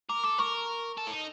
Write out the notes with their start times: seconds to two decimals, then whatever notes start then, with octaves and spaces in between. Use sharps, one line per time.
0.09 A#4 D6
0.23 A4 D6
0.38 A#4 C#6
0.98 A4
1.07 E4
1.12 D#4